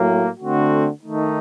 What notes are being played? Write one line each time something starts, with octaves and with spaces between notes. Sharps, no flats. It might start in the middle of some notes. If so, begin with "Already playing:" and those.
Already playing: A2 F#3 A#3
D3 A3 C4 F#4
D#3 A3 D#4